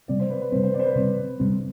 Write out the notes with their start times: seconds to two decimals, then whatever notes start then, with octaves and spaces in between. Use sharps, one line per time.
0.08 C3 G3 C4 D5
0.20 C5
0.30 B4
0.41 B4
0.52 C3 G3 C4 C5
0.63 C5
0.74 D5
0.80 C5
0.86 B4
0.95 C3 G3 C4
1.40 C3 G3 C4